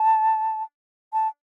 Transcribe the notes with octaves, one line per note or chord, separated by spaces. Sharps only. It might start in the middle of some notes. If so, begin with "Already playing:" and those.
Already playing: A5
A5